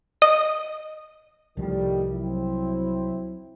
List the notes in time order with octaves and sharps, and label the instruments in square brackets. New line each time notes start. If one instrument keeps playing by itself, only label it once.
[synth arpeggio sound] D#5
[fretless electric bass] C2 F3 [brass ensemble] A2 D#3 G3
[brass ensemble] F#3 C4 E4